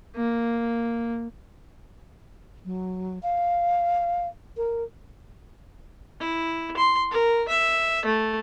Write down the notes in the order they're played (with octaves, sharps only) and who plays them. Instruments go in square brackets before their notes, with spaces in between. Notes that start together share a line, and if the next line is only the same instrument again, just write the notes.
[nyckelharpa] A#3
[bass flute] F#3
F5
A#4
[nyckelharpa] E4
C6
A#4
E5
A3